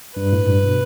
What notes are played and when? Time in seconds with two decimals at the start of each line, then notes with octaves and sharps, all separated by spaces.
0.17 G2 B4
0.33 A2
0.47 G2
0.63 B2